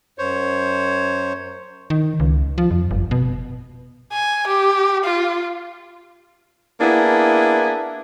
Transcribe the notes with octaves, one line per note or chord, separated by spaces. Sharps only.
F#2 C5 C#5
D#3
C#2
F3
F2
G1
B2
G#5
G4
F4
A#3 B3 D4 E4 G#4